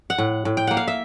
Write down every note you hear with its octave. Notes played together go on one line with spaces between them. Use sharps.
F#5
A2
A2
G5
A#3 F#5
F5
E5